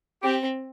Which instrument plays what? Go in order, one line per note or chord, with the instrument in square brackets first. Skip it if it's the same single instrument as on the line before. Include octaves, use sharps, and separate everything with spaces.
[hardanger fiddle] C4 [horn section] G4